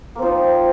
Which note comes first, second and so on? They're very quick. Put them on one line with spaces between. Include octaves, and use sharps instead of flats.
A#3 C4 F3 D#4